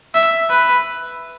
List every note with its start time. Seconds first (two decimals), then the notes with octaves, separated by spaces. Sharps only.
0.15 E5
0.50 B4